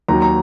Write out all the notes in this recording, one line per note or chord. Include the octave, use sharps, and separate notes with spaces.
D#2 D#3 F#3 A#5
A#5